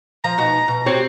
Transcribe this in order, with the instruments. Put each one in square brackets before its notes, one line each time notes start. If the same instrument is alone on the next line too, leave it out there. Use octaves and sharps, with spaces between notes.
[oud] F3 [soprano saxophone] A#5
[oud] B2 D#4 F#4
B2
[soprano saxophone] C4 [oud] F#4 G4 C#5